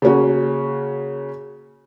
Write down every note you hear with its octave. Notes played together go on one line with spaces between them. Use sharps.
C#3 A#3 C#4 F#4